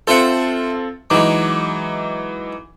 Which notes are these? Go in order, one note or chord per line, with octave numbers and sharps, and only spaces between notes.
C4 F4 A4 C5 E5 F#5
E3 F#3 G#3 D#4 D6